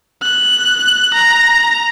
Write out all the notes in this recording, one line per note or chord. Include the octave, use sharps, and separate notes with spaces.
F#6
A#5